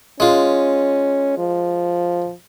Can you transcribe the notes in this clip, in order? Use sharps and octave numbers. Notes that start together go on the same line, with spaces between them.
G#3 C#4 F4
F3